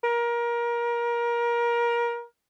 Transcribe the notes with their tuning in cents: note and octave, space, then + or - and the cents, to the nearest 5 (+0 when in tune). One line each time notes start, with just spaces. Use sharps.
A#4 +25